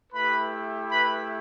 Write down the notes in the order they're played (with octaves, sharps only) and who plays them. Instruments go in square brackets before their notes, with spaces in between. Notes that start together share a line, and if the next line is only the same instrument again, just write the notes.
[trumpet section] A3 E4 G4 B4 B5
B4 B5